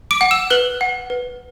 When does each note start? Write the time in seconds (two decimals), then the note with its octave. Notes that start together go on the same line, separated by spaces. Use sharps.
0.11 D6 D7
0.21 F#5
0.31 E6 E7
0.50 B4 F#6 F#7
0.81 F#5
1.10 B4